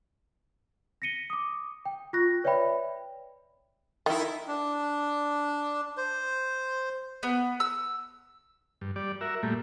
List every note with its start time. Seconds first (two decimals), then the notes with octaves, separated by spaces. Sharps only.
1.02 A#6 B6 C#7 D#7 G7
1.30 D6 D#6
1.85 G5
2.13 F4 C#6 F#6 A#6
2.44 B4 C#5 D5 E5 G5 B5
4.06 D#3 D#4 E4
4.47 D4
5.97 C5
7.23 B3
7.60 E6
8.81 G2
8.96 G3 D5
9.21 F#4 A#4 E5
9.43 A#2 G3 A3